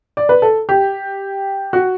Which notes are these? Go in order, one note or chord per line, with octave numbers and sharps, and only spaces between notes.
D5
B4
A4
G4
F#4